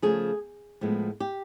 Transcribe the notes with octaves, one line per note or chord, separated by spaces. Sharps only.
C#3 F3 A3 G#4
A2 F3 G#3 B3
G4